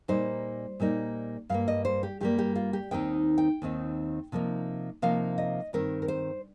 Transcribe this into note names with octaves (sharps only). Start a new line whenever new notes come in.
A#2 G3 A#3 D#4 C5
A#2 G3 A#3 D#4
G2 G3 A#3 F5
D#5
C5
G4
G2 G3 A#3 G4
G4
F4
G4
D#2 D#3 C4 D#4 G5
G5
D#2 D#3 C4 D#4
C3 F3 A#3 D#4
C3 F3 A#3 D#4 F5
D#5
G2 D#3 C4 A#4
A#4
C5